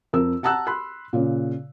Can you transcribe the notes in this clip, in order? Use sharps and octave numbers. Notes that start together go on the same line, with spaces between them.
F2 A#4 E6
F#5 A5 A#5 E6 F#6
B5 C6 F#6
A#2 C#3